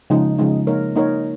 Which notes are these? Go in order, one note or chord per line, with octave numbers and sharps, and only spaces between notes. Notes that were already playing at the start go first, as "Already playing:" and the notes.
C#3 F3 G#3 D#4
C#3 F3 G#3 D#4
A#3 D#4 A#4 C#5
A#3 D#4 A#4 C#5